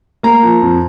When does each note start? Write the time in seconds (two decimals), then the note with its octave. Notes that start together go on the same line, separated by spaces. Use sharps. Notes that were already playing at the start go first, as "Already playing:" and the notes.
0.23 A#3 A#5
0.43 F3
0.62 F2